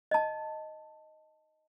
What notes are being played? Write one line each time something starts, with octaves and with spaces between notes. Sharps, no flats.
D#5 A5